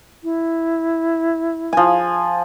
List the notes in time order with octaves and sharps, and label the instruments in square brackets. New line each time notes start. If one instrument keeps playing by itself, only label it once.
[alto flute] E4
[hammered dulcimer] F3 G#5